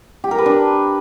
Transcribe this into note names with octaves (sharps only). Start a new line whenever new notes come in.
G4
A#4
B4
D4